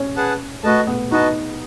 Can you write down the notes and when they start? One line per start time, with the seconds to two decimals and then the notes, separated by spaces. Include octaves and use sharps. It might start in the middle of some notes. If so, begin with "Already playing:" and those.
Already playing: C#4
0.17 G#4 B4 F#5 A5
0.63 A3 F#4 B4 D#5 A5
0.87 B3
1.11 D#4 F#4 B4 D#5 A5